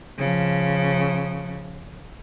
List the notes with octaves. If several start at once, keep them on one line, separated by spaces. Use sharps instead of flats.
C#3 F3